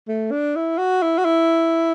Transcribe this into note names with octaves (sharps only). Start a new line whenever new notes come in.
A3
D4
E4
F#4
E4
F#4
E4